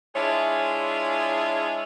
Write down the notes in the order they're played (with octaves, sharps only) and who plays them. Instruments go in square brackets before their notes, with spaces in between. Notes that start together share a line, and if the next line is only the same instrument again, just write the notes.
[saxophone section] G#3 D4 E4 F4 G#4 C#5